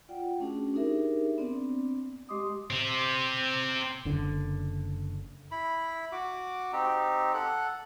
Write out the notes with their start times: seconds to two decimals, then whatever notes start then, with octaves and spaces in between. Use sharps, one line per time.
0.09 F4 D5 F#5 G5
0.40 A3 C#4 D4 F#4 G#4
0.74 D4 D#4 G4 G#4 A#4 E5
1.38 B3 C4 D4 D5
2.29 G#3 G4 D#5 C6 D6 D#6
2.70 C4 G4
4.05 F#1 D3
5.51 E4 B5
6.12 F#4 D6
6.73 C4 D#4 G4
7.34 A4 F#5